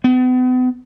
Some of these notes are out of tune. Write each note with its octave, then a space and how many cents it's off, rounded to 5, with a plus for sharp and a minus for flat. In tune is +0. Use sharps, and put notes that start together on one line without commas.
B3 +40